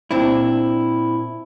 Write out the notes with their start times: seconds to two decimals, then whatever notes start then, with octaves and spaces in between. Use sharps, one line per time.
0.11 A#2 C4 D4 E4